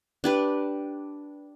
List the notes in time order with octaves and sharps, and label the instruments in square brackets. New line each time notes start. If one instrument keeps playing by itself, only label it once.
[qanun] D4 G4 B4